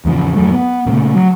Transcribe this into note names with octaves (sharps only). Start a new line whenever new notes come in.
E2 G#2 C#3 F3
F2 G#2 F#3 A3
B3
A#2 C#3 G#3 A3
F#3